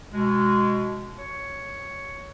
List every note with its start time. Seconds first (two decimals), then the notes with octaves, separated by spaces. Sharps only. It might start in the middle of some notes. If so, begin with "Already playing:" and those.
0.13 B2 G#3
1.17 C#5